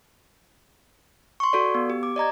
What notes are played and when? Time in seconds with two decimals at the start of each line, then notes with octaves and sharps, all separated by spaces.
1.40 C6 C#6
1.53 F#4 A4 D5
1.75 B3
1.90 G4
2.03 D6
2.16 D5 D#5 A#5 G#6